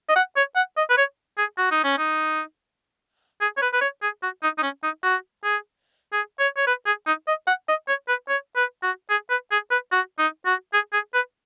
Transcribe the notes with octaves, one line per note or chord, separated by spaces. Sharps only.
D#5
F#5
C#5
F#5
D#5
B4
C#5
G#4
F#4
D#4
C#4
D#4
G#4
C#5
B4
B4
C#5
G#4
F#4
D#4
D#4
C#4
D#4
F#4
G#4
G#4
C#5
C#5
B4
G#4
D#4
D#5
F#5
D#5
C#5
B4
C#5
B4
F#4
G#4
B4
G#4
B4
F#4
D#4
F#4
G#4
G#4
B4